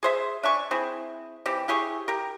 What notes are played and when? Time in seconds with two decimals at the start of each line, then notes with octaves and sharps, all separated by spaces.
0.03 G#4 C5 E5
0.43 D4 E5 G#5 C#6
0.71 C4 E4 G#4
1.46 E3 C4 G4
1.68 E4 G4 G#4 C#6
2.08 G4 A#4